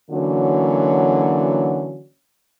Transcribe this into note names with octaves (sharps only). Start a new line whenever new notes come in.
D3 E3 F#3 A#3 C#4 F#4